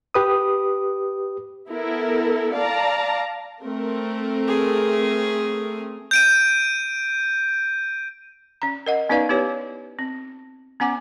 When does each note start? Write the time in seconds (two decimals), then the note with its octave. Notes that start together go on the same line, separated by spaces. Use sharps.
0.14 G4 B4 D#6
1.69 B3 E4 A4 A#4
2.54 D5 F5 A5 A#5
3.63 A3 C4 A#4
4.48 G#4
6.11 G6 D7 D#7
8.62 C#4 A#5
8.86 A#4 D#5 F#5
9.09 B3 C#4 D#4 B4 D5 F5
9.29 B3 E4 G4 B4 C#5
9.99 C4
10.80 B3 C#4 F#5 G#5 D6